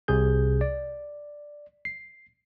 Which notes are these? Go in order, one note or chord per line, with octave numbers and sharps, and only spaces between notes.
C2 C3 G#4 G6
D5
C7